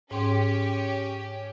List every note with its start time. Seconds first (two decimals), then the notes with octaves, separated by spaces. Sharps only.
0.11 G#2 C#4 G4 C6